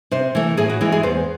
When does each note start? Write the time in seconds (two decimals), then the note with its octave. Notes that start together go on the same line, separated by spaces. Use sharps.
0.11 C3 C5
0.35 E3 A3
0.57 A2 G#4
0.70 F#4
0.81 E3 G#3 E4
0.92 G#4
1.03 E2 C5